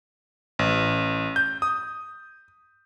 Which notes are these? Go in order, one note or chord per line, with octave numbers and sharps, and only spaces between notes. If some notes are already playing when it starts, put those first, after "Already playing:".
A1
G6
D#6